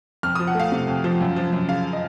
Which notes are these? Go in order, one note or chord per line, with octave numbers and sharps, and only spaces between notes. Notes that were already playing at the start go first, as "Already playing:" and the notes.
F2 F6
F3 D#6
F#5
A3 F5
C3
F2
F3
F#2
F3
F#2
C#3 F5
D#5